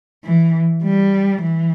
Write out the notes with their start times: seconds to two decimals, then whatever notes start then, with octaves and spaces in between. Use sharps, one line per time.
0.24 E3
0.83 G3
1.43 E3